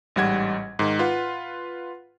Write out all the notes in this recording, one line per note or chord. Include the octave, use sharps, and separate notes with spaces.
A1 G#2 G3 F#5 G#6
G#2 D#3
F4 B4 F#5